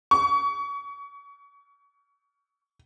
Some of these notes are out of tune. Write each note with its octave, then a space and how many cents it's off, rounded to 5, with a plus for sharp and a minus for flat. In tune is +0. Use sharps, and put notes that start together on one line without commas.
C#6 +25